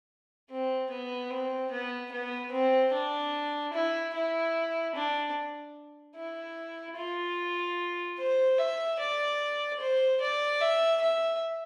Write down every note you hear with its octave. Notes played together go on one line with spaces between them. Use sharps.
C4
B3
C4
B3
B3
C4
D4
E4
E4
D4
E4
F4
C5
E5
D5
C5
D5
E5
E5